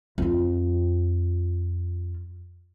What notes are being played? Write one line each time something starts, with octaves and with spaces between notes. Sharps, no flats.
F2 F4